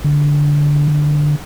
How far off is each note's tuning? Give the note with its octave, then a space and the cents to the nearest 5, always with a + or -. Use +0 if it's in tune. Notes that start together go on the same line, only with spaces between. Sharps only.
D3 -10
D3 +10